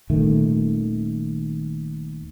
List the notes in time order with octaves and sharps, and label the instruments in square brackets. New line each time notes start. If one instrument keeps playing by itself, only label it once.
[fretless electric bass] D#1 D#3 A3